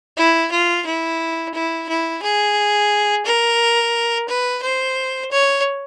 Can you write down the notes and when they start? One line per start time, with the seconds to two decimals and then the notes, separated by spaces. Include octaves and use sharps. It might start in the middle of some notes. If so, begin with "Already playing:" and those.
0.17 E4
0.51 F4
0.86 E4
1.54 E4
1.89 E4
2.22 G#4
3.25 A#4
4.28 B4
4.62 C5
5.31 C#5